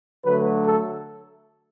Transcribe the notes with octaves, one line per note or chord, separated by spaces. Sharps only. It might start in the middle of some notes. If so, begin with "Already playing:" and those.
D3 F#3 A3 B4
A4